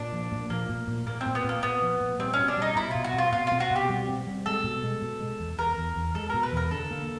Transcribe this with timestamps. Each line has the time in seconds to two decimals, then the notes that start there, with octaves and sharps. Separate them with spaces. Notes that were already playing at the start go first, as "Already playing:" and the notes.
Already playing: A#2 D4
0.13 F3
0.32 A#2
0.50 F3 A#3
0.69 A#2
0.87 A#2
1.07 A#2 A#3
1.21 C4
1.26 A#2
1.35 B3
1.44 A#2
1.49 A#3
1.63 A#2 B3
1.82 F3
2.01 A#2
2.19 G3 C4
2.34 B2 C#4
2.48 D4
2.57 G3 D#4
2.76 B2 E4
2.91 B2 F4
3.04 F#4
3.14 C4 F4
3.32 B2 F4
3.47 C4 F4
3.60 F#4
3.71 B2 G4
3.89 G3
4.08 C4
4.27 G3
4.46 G#3 A4
4.64 B2
4.84 G#3
5.02 B2
5.20 G#3
5.40 E2
5.58 E2 A#4
5.77 E2
5.96 E2
6.15 G#3 A4
6.30 B2 A#4
6.43 B4
6.52 E2 A#4
6.71 D3 A4
6.91 A#3